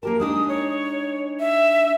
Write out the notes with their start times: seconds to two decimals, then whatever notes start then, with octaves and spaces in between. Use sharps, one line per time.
0.03 A#3 G4 A#4 A5
0.20 G#3 D4 D#4 D#6
0.48 C#5
1.40 E5